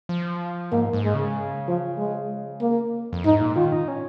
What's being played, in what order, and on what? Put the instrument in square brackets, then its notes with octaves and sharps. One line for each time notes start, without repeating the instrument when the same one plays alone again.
[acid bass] F3
[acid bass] G#2 [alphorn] A#3
[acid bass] G#2
[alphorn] G#3
[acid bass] C#3
[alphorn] F3
G#3
A#3
[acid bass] F2
[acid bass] G#2 [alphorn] D#4
[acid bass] A#2
[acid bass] D#3 [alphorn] F4
[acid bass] D#4
C#4